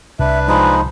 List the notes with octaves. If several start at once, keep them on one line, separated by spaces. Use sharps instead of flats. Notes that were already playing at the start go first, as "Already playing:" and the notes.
C2 D4 B4 E5
F3 G#3 D#4 B5